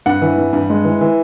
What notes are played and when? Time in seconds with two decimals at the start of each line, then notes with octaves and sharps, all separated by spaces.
0.06 G2 F#5
0.22 E3
0.38 G2
0.53 G2
0.70 G#3
0.85 E3
1.01 E3